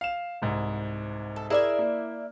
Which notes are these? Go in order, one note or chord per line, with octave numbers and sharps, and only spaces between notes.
F5 E7
C2 G#2
A4
E4 G#4 A#4 D5 E5
A#3